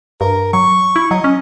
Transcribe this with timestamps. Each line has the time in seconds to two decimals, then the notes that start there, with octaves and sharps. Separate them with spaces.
0.21 G2 A#4
0.53 F#3 C#6
0.96 E4
1.11 F#3 D#5
1.24 C#4